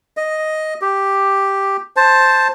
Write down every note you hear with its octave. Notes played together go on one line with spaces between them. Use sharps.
D#5
G4
C5 A5